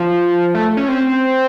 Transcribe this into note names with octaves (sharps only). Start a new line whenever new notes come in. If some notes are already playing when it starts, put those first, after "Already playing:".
Already playing: F3
A3
C#4
C4